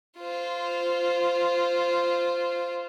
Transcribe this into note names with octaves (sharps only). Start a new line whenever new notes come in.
F4 C5